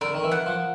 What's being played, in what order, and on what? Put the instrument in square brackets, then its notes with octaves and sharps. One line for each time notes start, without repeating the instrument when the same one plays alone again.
[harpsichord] D3 [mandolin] A#4
[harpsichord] D#3
E3
[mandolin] F#5
[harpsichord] F3